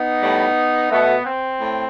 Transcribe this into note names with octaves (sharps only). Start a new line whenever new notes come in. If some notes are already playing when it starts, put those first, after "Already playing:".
Already playing: B3 D#4
A2 G3
B2 A3 B3
C4
A2